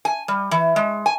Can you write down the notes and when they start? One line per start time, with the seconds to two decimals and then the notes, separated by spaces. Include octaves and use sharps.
0.05 G#5
0.28 G3
0.51 E3
0.76 G#3
1.06 G#5